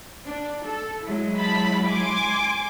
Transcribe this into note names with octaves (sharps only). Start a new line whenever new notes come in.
D4
A4
F#3 G#3 E4
A5 B5
G#5 C6 D6